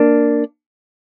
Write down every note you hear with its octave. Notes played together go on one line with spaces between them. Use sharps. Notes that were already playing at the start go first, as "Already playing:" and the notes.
Already playing: A#3 D4